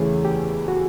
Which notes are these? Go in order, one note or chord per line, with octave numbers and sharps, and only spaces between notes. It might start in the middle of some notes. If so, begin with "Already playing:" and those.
Already playing: E2 C#3 E3 A3 C#4 G#4
G4
F#4